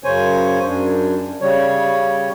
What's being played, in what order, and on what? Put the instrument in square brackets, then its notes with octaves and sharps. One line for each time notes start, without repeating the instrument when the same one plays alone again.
[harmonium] F#2 C#3 C5 C#5 G#5
F#2 D4
C#3 G3 C#5